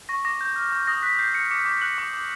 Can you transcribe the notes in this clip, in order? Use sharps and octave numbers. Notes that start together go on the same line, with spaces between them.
C#6 A#6
D6 A#6
G6
F6
D6
D#6 A#6
F#6 B6
G6 C7
G6 C#7
D6 C#7
D6
F#6 F#7
D6
D6